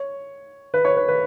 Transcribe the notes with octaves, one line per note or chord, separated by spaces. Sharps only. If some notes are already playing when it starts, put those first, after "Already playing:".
Already playing: C#5
B4
C#5
B4
B4